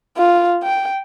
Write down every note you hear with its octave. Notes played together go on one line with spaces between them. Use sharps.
F4
G5